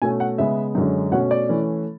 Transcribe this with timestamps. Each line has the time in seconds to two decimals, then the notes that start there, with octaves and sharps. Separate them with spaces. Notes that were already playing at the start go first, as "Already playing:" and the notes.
0.02 B2 A3 C#4 G#5
0.20 F#5
0.38 C#3 G#3 B3 E5
0.75 F#2 D3 G#3 C#4
1.12 B2 A3 C#4 F#5
1.31 D5
1.49 E3 A3 C#4